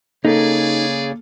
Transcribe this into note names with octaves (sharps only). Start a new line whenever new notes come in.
C#3 A#3 D#4 G#4 A4 C#5 D5